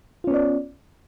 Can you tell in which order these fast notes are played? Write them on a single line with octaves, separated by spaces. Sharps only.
F4 C#4 B3 D5